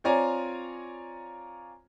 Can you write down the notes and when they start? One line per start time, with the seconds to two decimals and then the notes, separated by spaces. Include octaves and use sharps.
0.04 C4 F4 C#5 D5 G#5 A#5